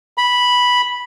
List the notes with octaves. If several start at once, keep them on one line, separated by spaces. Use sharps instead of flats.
B5